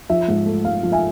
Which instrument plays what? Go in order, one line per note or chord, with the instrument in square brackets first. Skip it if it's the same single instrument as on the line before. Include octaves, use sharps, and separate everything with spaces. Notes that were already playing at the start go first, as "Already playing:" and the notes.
[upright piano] F3 E5
G#2
A3
G#2 F5
F3
E5 G#5